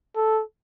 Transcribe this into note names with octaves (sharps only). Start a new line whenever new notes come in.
A4